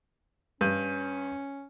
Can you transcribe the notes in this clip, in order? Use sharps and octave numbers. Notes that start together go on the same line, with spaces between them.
G2 C#4